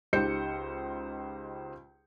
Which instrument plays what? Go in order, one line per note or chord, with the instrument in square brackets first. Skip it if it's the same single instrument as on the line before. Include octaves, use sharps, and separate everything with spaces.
[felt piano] C#2 D#4 G4 C5 G6 C#7